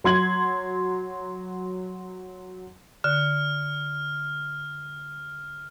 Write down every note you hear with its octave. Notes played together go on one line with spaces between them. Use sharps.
F#3 C6 G#6 F#7
D3 F6